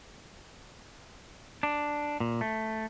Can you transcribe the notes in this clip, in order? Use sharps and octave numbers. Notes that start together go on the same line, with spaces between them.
D4
A#2
A3